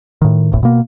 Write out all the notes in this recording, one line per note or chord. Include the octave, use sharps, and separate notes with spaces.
A2 D#3
D1 G1 A2
B2 A#3